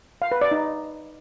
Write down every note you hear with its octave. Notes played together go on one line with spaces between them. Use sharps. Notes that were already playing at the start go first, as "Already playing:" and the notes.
F5
B4
D5
D#4